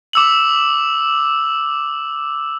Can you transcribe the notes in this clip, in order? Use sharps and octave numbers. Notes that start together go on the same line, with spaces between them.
D6 E6 F#7